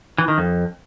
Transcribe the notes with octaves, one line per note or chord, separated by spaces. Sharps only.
E3
D#3
F2